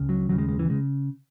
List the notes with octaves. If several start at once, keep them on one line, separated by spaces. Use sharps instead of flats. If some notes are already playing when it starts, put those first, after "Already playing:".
Already playing: C#2 C#3
F#3
D#2 C#3 F#3
G#3
G#3
E3
C#3 G#3